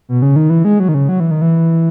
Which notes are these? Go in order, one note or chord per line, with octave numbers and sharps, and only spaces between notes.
B2
C#3
D#3
E3
G#3
F#3
D#3
C#3
F#3
E3
D#3
E3